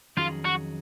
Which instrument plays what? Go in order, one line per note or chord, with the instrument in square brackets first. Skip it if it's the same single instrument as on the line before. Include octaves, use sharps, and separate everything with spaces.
[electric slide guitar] F2 D#3 F#3 C#4 G#4 [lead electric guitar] F4
[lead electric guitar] F#4